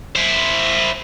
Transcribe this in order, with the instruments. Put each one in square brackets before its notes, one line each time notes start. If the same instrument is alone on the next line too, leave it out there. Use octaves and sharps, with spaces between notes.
[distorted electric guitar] E4 C5